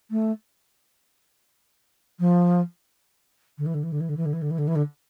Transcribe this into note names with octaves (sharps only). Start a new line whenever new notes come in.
A3
F3
D3
E3
D3
E3
D3
E3
D3
E3
D3
E3
D3
E3
D3
E3
D3